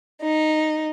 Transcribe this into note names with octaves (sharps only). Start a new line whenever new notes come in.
D#4